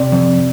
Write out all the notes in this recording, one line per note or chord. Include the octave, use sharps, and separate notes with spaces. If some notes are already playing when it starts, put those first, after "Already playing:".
Already playing: C3 D5
F2